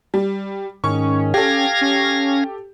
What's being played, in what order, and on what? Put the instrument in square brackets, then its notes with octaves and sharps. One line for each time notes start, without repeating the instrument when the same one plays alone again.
[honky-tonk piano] G3
[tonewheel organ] G#2 D#3 [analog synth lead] C#4 [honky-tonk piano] C#6
[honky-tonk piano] G4 A4 [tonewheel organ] F5 G#6 A#6
[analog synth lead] C#4